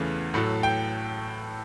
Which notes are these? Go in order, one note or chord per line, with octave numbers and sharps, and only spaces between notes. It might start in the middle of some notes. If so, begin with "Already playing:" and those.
Already playing: E2 C#3 E3 A3
A2 F#3 A3
G5